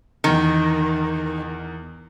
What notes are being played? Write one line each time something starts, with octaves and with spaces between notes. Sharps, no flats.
E2 D#3 A#4 C#7